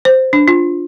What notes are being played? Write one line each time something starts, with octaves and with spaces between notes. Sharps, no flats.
C5
D4
F4